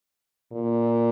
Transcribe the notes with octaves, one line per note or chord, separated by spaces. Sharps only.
A#2